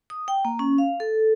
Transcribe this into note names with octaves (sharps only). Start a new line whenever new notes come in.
D#6
G5
A#3
C#4
F5
A4